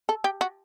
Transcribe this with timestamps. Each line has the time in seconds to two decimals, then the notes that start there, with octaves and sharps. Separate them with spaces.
0.09 A4
0.24 G4
0.41 F#4